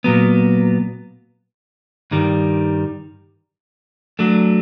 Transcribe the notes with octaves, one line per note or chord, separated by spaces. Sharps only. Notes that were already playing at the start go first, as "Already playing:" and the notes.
A#2 F#3 B3
G2 D#3 G3
F#3 A3 D4